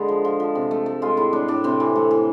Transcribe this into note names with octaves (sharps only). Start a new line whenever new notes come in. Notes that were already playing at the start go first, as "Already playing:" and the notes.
Already playing: D3 G#3 G#4 B4
F3
F3
F3
C3
A3
A3
G#3 F4
A2 E4
A2 D4
A2 D4
C3 C4
E3
A3
E3